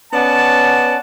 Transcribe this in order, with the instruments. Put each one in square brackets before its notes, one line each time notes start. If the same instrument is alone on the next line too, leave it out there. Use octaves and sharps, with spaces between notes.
[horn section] B3 C#4 D5 F#5 A5